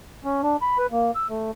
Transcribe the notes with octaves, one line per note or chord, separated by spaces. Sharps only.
C#4
D4
B5
B4
A#3
E6
A3